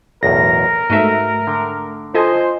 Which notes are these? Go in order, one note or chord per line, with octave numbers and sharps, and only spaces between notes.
B1 E2 A2 A#4 A#6
G#2 A3 F#4 B4 D#5 E5
D3 G5
F4 A4 C5 D#5 G#5